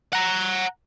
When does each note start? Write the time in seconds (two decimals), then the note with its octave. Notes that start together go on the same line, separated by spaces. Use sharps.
0.13 F#5 A#5